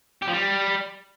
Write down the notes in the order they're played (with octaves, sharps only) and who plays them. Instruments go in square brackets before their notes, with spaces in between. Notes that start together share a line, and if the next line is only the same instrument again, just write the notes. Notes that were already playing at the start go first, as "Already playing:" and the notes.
[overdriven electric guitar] G4
F3
G3